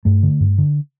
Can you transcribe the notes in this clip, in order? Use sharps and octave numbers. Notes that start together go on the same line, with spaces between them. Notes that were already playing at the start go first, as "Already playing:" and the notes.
G2 A3
D3
G2
D3